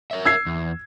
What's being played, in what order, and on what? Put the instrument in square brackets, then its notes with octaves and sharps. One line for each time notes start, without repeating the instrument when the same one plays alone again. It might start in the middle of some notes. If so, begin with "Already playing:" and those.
[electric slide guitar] A#4 C#5 E5
[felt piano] E6 G#6 C7
[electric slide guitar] E2